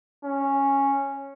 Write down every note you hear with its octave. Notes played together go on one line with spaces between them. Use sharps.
C#4